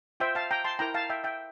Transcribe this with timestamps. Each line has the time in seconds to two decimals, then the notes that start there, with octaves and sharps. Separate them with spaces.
0.20 F4 C5 E5 G5
0.35 F5 A5
0.51 G5 A#5
0.64 A5 C6
0.79 E4 A#4 G5 A#5
0.94 F5 A5
1.10 E5 G5
1.24 E5 G5